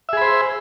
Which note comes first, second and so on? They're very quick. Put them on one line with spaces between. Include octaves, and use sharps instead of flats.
E5 G#4 B5 C5